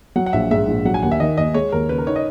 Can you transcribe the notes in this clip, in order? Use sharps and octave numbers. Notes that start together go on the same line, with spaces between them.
F#3 F#5
F#5
A#1 E5
G#2 E5
A#1
F#3 F#5
G#5
D#2 F#5
E5
D#3 D#5
D#2 D#5
G#3 C#5
D#2 A#4
C#3 B4
A#4
D#4 C#5
D#5